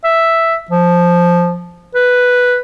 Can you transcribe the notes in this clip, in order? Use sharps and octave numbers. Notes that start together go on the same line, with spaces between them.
E5
F3
B4